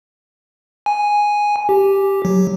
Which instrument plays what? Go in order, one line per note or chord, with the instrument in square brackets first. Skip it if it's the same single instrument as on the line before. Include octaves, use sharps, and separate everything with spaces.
[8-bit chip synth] G#5
G4
F#3